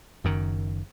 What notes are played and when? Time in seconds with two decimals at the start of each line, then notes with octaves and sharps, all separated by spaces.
0.24 F#1 F#2 D#3